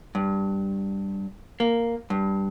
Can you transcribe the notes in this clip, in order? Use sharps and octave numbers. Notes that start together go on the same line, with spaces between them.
G2
A#3
G2